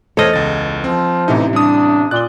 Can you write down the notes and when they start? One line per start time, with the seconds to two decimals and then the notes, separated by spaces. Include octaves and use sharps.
0.17 E2 A3 A4 C5 C#5 D#5 F6 G#6
0.33 C#2 A6
0.84 F3 C4
1.28 A1 C3 E3 A3 D#4 E4
1.53 G3 D4 D#6
2.11 A#2 D5 F#6 G7